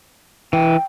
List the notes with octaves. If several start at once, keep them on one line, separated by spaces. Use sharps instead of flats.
E3 G5